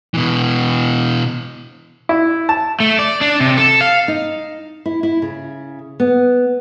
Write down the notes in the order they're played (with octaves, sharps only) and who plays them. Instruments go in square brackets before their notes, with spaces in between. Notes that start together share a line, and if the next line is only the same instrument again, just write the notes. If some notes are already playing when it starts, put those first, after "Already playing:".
[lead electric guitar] B2 E3
[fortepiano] E4
A5
[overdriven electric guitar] A3
D5
D4
C3
A4
F5
[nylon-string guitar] D#4
E4
E4
C#3
B3